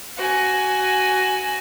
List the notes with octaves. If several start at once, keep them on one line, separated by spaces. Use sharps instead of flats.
F#4 G#5